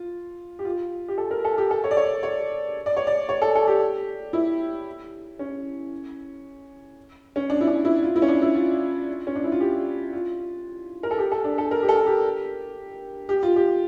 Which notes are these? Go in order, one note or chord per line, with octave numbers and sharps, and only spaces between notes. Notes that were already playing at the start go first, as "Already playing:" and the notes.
Already playing: F4
G4
F4
G4
A4
A#4
A4
G4
A4
C#5
D5
C#5
C#5
D5
C#5
D5
C#5
A4
A4
G4
E4
C#4
C#4
D4
E4
D4
E4
F4
E4
C#4
D4
E4
F4
C#4
D4
E4
F4
G4
F4
A#4
A4
G4
A4
D4
A4
A#4
G4
A4
G4
G4
F4
G4